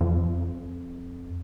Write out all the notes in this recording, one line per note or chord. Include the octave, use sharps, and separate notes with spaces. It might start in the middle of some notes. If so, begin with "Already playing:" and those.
F2